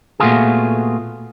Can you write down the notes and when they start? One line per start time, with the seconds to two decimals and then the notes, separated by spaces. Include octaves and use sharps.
0.20 A#2 A3 B3 F4 F#4 G#4